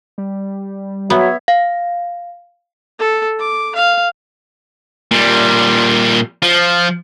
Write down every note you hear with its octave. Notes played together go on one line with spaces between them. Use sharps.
G3
F#3 B3 C#5 E5
F5
A4
D6
F5
A#2 G3
F3